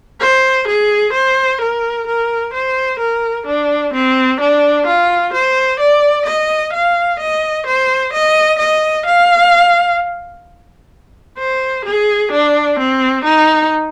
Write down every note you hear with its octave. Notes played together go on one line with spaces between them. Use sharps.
C5
G#4
C5
A#4
A#4
C5
A#4
D4
C4
D4
F4
C5
D5
D#5
F5
D#5
C5
D#5
D#5
F5
C5
G#4
D4
C4
D#4